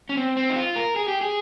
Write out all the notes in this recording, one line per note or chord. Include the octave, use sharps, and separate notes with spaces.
C#4
C4
C4
D#4
F4
A#4
G#4
G4
G#4